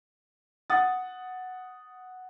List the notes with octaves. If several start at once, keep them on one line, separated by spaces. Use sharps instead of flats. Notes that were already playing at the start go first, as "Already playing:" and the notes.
F#5 D#6 A6